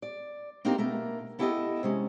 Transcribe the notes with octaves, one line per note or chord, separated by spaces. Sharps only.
D5
A#3 C4 D4 D#4 G4 A#4
B2 A3 A#3 A#4
B3 E4 G4 A4 C#5 D#5
C3 G#3 C#4